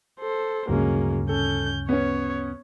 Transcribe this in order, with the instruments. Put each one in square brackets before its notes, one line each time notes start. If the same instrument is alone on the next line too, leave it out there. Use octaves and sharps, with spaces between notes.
[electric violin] A4 C5
[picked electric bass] D2 G2 C#3 [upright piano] F#3 G#3 [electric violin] A#3 C#4
[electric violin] C#4 G6 [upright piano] A4
[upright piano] B3 C#4 [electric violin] C#5